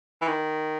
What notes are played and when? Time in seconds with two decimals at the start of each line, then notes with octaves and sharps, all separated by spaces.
0.21 E3
0.28 D#3